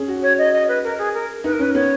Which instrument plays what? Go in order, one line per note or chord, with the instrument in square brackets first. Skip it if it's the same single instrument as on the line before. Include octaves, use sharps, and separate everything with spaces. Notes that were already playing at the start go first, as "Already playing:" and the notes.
Already playing: [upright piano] C#4 G#4
F#4
[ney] C#5
D#5
D#5
B4
A#4
G#4
A#4
[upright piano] D#4 [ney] B4
[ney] A#4
[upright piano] C#4 [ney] B4
[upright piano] B3 [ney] C#5